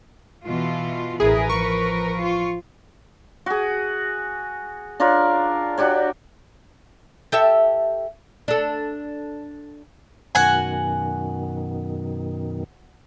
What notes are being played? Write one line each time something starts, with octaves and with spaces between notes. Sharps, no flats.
B2 E3 F4
A1 E4 G#4 A#4 B4
F3 C#6
F4
F#4 G#4
D4 F4 A#4 C#5
D4 F#4 G4 C#5
G4 A4 E5
D4 A4
F#2 B2 D#3 F#4 F#5 G#5